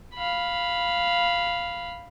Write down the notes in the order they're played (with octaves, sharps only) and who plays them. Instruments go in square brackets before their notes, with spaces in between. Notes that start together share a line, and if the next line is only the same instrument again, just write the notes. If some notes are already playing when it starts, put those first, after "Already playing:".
[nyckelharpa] F5 B5